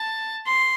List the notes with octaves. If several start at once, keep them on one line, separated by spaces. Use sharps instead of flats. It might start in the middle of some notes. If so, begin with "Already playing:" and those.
Already playing: A5
C6